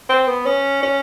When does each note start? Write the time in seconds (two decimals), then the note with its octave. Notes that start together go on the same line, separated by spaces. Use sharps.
0.09 C4
0.28 B3
0.46 C#4
0.83 C#4